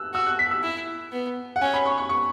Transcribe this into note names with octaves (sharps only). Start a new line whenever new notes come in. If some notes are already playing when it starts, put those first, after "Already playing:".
Already playing: E6 F#6
F#4 E6
F#6
B6
E6
E4
B3
F#5
C#4 G#5
B5
C#6
C#6
C#6